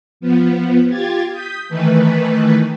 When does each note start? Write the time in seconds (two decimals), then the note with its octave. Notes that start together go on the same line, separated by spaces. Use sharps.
0.20 F3 B3
0.89 F4 G4 G#6 A6
1.31 D#6 G6 B6
1.69 D#3 E3 A3 B4